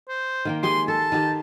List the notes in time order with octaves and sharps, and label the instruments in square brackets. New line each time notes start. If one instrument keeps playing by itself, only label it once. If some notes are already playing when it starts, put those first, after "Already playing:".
[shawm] C5
[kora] D#3 A#3 G5
[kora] G#3 G4 G#4 [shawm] C6
[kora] A4 [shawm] A5
[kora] D#3 D#4 G4